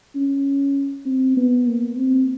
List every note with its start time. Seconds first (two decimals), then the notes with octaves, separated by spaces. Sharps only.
0.15 C#4
1.06 C4
1.37 B3
1.67 A#3
1.97 C4